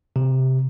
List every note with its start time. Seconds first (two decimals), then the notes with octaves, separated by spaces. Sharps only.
0.16 C3